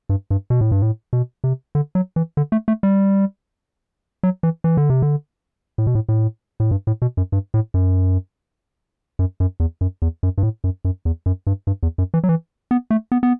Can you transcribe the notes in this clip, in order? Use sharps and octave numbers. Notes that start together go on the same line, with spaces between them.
G2
G2
B2
A2
G2
A2
B2
C3
D3
F#3
E3
D3
A3
A3
G3
F#3
E3
E3
D3
C3
D3
A2
B2
A2
A2
A2
G2
A2
B2
F#2
G2
A2
F#2
F#2
F#2
E2
F#2
E2
F#2
G2
A2
F#2
F#2
E2
F#2
G2
G2
E2
F#2
E3
F#3
E3
B3
A3
B3
B3